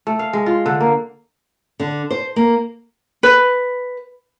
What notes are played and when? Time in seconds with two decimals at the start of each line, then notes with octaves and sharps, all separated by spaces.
0.07 A3
0.19 F5
0.33 G#3
0.46 F4
0.66 D3
0.81 A#3
1.80 D3
2.10 C5
2.36 A#3
3.23 B4